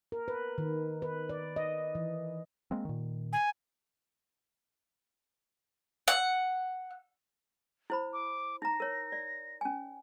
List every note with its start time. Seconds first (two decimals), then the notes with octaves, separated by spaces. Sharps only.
0.12 A#4
0.28 B4
0.58 D#3
1.02 B4
1.29 D5
1.56 D#5
1.95 E3
2.71 G#3 A#3 C4
2.85 A#2 D#3
3.33 G#5
6.08 F#5
7.90 E4 C5 B5
8.13 D6
8.62 D#4 A#5 A#6
8.80 A#4 C#5
9.12 D5
9.61 C#4 G#5